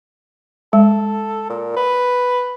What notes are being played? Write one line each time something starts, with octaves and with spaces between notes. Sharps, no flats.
G#3 A4
A#2
B4